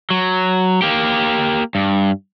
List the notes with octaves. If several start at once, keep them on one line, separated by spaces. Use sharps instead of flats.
F#3
A#3 G4
G2